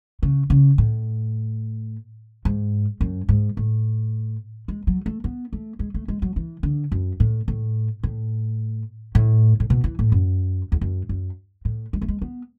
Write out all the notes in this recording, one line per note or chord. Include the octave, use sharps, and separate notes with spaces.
C#3
C#3
A2
G#2
F#2
G#2
A2
G#3
F#3
A3
B3
A3
G#3
A3
G#3
F#3
E3
D3
F#2
A2
A2
A2
A2
A2
B2
E3
A2
F#2
E2
F#2
F#2
A2
G#3
A3
G#3
B3